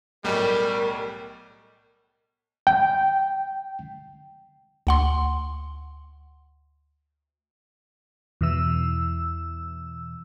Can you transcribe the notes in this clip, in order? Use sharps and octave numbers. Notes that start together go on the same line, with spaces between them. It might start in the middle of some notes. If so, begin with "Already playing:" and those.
B1 A2 G3 A#4
G5
D2 F#5 C6
E2 B2 E3 E6